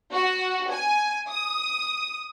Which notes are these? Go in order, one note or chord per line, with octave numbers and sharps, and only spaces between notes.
F#4
G#5
D#6